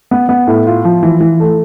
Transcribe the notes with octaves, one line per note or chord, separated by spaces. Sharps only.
B3
B3
A2
F4
F3
E3
E3
A3